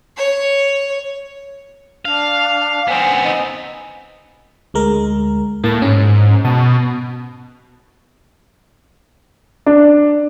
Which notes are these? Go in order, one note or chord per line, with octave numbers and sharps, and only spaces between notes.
C#5
D4 F5
B3 C4 G#5
D#4
D2 G#3 A#4
A2 A#3 A5
G#2 C#4
B2 A5 D#6
D4